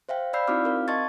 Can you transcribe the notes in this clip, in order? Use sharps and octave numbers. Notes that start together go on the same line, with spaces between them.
C5 E5 F5 G5
D5 F5 B5 E6 G6 C7
C4 D#4 E4 F#4 D6 F6
C4 A#4 F5
D#5 A5 C6 C#6 G#6 A6